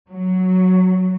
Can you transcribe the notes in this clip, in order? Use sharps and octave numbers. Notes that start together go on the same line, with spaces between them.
F#3